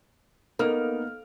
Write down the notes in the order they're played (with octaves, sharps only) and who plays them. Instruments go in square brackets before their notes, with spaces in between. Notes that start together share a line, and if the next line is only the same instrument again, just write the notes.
[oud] A#3 [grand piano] B3 D#4 F6